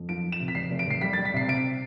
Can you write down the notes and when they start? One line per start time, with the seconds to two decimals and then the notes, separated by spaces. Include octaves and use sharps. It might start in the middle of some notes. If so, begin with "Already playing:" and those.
Already playing: F2
0.09 F3 D7
0.24 F3
0.32 E7
0.40 C3
0.48 B6
0.55 F1 C7
0.71 F1
0.79 D7
0.87 F1 C7
1.01 G3 B6
1.13 G3 A6
1.25 B6
1.34 C3 C7
1.48 C3 D7